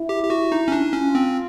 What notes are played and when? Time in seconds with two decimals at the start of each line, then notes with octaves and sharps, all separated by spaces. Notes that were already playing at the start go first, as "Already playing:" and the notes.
Already playing: E4
0.09 G4
0.23 G4
0.30 F#4
0.52 D#4
0.68 C#4
0.72 D4
0.93 C#4 F4
1.15 C4